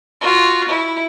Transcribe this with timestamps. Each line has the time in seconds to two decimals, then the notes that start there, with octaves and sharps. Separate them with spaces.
0.21 F4 F#4
0.69 E4